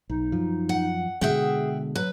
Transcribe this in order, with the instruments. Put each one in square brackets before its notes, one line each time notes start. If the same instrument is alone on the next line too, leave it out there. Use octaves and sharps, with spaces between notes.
[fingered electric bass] B1 [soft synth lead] D#4
[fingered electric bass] F#2 F3
[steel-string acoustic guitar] F#5
[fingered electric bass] B2 D3 G#3 [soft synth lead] G#4 [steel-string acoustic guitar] E5 F#5 G5
[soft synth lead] F#3 [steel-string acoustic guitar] B4